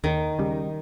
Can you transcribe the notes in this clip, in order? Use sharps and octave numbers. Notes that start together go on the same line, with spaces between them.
D#2 D#3
C#3 G3